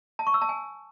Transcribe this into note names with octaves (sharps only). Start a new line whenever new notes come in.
A5
C#6
E6
A5
G#5